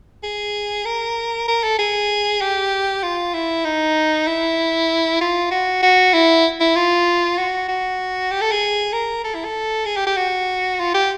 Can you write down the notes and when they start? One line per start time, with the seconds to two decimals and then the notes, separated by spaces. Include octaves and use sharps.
0.23 G#4
0.85 A#4
1.48 A#4
1.63 A4
1.79 G#4
2.41 G4
3.03 F4
3.34 E4
3.65 D#4
4.27 E4
5.21 F4
5.51 F#4
5.82 F#4
6.13 E4
6.60 E4
6.76 F4
7.38 F#4
7.68 F#4
8.31 G4
8.41 A4
8.52 G#4
8.93 A#4
9.24 A4
9.34 E4
9.45 A4
9.86 G#4
9.96 G4
10.06 G4
10.17 F#4
10.80 F4
10.94 G4